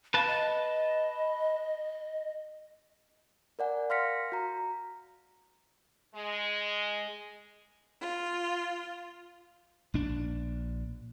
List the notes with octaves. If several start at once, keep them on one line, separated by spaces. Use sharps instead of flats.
B4 F5 A5
D#5
A#4 D5 F#5 G#5
F5 C6 F6 A#6 B6 C#7
F#4 A#5
G#3
F4
A#1 D4